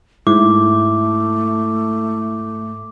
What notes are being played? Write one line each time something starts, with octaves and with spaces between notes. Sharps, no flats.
G#2 A3 E4 D6